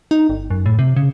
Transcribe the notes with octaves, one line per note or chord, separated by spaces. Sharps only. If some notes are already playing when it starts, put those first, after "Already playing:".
D#4
G1
F#2
A2
C3
C#3